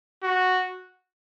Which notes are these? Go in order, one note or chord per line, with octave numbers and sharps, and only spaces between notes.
F#4